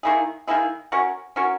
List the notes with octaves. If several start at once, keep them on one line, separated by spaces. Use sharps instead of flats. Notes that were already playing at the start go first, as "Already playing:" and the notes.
D#3 A#3 E4 G#4
D#3 A#3 E4 G#4
C#4 F#4 A#4
C#4 F#4 A#4